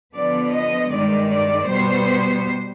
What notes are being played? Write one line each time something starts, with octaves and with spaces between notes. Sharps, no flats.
D3 F3 B3 D5
D#5
G2 D#3 G#3 D5
D5
B2 G3 B3 C5